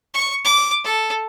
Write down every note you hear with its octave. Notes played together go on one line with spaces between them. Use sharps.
C#6
D6
A4